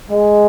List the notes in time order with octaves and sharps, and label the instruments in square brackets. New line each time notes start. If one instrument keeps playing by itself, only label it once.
[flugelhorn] G#3